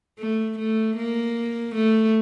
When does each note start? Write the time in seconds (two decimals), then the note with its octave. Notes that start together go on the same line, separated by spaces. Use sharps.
0.19 A3
0.58 A3
0.97 A#3
1.75 A3